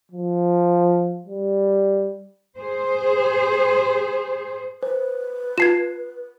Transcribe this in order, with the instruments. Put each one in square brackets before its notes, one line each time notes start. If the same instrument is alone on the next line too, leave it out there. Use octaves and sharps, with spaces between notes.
[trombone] F3
G3
[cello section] G#4 C5
[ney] B4 [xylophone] C5
[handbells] F4 A5 [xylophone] G#6 C7 E7